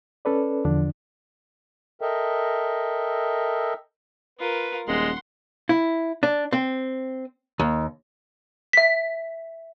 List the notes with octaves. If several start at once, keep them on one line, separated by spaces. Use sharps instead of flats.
C#4 A4 B4 D5
E2 D3 F3 D4
A4 A#4 D#5 E5 G5
F4 A#4 B4
D#1 G#3 F#5 C6
E4
D4
C4
D#2
E5 B6